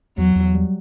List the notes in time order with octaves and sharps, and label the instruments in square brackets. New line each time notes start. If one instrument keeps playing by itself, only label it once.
[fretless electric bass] E2 [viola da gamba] F#3
[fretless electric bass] E2
G3